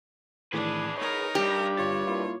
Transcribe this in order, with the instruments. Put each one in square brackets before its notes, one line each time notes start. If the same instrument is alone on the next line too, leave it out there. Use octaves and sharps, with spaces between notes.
[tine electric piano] A2 D#3 E3 [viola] D4 [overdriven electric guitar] G#4 B4
[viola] D#4 A#4 [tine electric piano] C#5
[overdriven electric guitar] E2 G2 [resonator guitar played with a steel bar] G4
[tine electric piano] G1 F4 A6 [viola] C#5
[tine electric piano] A#3 E4 F4